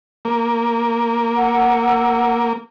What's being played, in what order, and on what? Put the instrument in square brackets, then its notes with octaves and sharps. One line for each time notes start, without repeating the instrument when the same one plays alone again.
[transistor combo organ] A#3
[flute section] F#5 E6